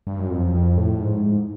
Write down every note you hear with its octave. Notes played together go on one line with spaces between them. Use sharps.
G2
F#2
F2
F2
A2
G#2